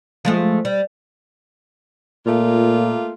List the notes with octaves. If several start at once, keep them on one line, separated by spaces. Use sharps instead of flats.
F3 G#3 A3
G3
A#2 A3 A#3 F4